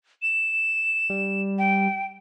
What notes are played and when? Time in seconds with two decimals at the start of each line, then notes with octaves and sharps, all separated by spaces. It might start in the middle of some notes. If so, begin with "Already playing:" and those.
0.22 E7
1.10 G3
1.58 G5